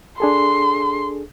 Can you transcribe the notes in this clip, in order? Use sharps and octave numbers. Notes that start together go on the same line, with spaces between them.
D4 G#4 A4 C6